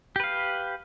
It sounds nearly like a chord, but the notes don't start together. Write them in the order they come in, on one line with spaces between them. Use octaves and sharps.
G4 B4 F5